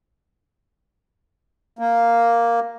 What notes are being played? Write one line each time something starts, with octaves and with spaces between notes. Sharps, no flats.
A#3